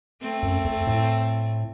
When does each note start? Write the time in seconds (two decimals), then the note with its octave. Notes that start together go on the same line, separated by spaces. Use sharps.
0.21 A3 C4
0.43 F#2
0.65 F2
0.87 A2